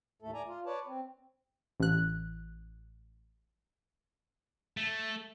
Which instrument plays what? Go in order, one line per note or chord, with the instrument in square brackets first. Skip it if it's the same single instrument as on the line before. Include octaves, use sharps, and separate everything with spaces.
[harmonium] D#2 A2 A3 A4
D5 G#5 A#5
F4
B4 C#5 D5 A5
C4
[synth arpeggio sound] A1 F#6
[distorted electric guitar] A3